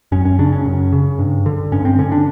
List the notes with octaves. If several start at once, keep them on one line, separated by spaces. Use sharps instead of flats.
F#2 C#4
C#4
C#3 D4
C#4
F#2
C#3
G2
D3
G2 C#4
C4
D3 C#4
D4